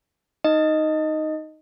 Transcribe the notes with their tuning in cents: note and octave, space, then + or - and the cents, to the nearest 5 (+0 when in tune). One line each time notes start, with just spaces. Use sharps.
D#4 +0 D#5 +0